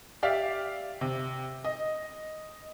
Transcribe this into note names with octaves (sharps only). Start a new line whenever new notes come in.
G4 D5 E5 F5
C3
D#5